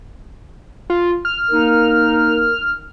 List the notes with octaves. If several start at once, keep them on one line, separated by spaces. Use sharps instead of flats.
F4
F6
A#3 D#4 A#4